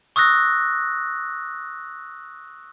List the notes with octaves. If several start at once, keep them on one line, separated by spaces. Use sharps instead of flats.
C#6 D#6 E6 F#6 A#6